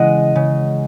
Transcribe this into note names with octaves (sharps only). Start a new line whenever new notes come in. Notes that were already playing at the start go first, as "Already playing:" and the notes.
Already playing: C#3 E3 G#3 D#5 F#5
C#3